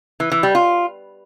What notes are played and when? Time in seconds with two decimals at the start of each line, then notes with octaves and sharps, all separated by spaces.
0.20 E3
0.32 E3
0.43 G3
0.55 F4